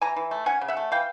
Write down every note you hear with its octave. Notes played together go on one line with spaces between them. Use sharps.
E3 G#5 A#5
E3
A3
C#4 F#5 G#5
C#3
E5 F#5
A3
E3 F5 G5